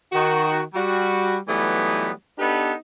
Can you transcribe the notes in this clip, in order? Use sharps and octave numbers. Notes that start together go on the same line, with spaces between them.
D#3 F#4
G3 F#4
E3 F#3 G3 A3 B3 D#4
B3 D4 D#4 G4 A4 B4